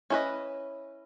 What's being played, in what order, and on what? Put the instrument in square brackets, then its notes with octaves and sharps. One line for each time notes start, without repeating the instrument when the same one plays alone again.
[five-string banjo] C#4 E4 G#4 B4 D#5